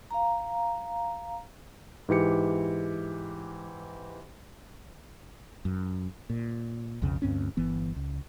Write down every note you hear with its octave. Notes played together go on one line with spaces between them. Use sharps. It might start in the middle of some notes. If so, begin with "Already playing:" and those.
F5 A#5
G#2 E3 G4 C#7
F#2
A#2
B1 F2 C#3
D2 G2 C4 C#4
G1 E3 B3
C#2